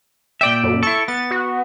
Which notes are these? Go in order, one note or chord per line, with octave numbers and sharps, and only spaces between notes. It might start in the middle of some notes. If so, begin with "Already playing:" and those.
A#2 D5 E5 G5
F#2
E4 A4 C#6
B3 A6
F#4